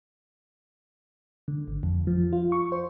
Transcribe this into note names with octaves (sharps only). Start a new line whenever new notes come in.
D3
G#1
F2
F3
F4
C#6
C5